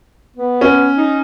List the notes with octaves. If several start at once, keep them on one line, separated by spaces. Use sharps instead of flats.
B3
C#4
D#4